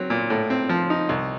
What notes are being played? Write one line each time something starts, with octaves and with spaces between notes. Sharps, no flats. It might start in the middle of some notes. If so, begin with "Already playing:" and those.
Already playing: F#3 C4
A#2
A2
C4
F3
D#4
C2